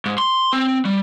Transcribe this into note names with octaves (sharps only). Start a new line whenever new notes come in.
G#2
C6
C4
G3